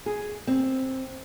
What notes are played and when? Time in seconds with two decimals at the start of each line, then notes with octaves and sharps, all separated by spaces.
0.06 G#4
0.47 C4